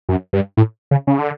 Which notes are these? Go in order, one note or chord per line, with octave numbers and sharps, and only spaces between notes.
F#2
G2
A2
C#3
C#3
D3